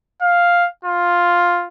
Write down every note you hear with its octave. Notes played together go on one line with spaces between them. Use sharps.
F5
F4